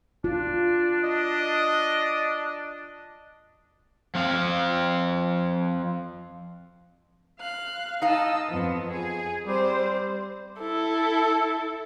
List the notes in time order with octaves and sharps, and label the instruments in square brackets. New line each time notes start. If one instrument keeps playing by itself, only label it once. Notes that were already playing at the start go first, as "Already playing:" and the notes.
[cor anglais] D4 [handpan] F4
[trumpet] D#5
[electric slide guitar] F3 C4 F5
[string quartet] F5 F#6
[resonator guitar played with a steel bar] D#4 F5 [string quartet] D#5 A5 E6
[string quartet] F2 B3
G#4
[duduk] G3 [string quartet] C4 C5
[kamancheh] E4 A4